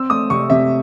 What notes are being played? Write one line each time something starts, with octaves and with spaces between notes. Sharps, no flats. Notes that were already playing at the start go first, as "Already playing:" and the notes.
Already playing: C4 E6
A3 D#6
C3 C#6
C3 E5